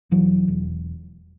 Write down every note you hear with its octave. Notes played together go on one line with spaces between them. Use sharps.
E1 E3 F#3
E1